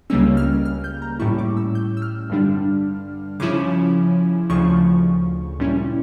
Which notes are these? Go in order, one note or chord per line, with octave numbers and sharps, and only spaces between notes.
C#2 C#3 G3 A#3 C#4 E6
F6
F6
G6
A#5
A2 G3 C#4 E4 C#6
D6
E6
G6
E6
F6
G2 D3 G3 D4
C#3 F3 C#4 E4 D6
D2 C#3 F3 C#6
A#2 G3 C#4 E4